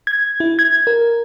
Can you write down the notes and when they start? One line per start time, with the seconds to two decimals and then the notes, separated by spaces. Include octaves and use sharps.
0.07 G#6
0.40 E4
0.59 G#6
0.87 A#4